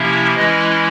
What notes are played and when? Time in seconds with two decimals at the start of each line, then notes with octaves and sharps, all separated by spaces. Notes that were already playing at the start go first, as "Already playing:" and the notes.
Already playing: C3 F3 A#3 C#4 E4 E5
0.35 E3 G#3 C#4 E4 D#5